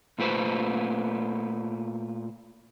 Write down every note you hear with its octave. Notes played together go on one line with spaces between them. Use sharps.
A#2 A3 F4 B4 C5